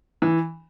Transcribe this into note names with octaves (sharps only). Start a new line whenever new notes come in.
E3